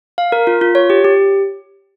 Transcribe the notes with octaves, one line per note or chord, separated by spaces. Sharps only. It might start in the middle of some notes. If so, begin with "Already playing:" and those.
F5
A#4
F4
F4
C#5
G4
G4